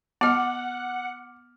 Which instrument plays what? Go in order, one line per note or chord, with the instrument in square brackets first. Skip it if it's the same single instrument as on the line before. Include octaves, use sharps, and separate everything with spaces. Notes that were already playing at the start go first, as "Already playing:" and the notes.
[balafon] B3 D#5 [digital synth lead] F#5 [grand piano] D6 F6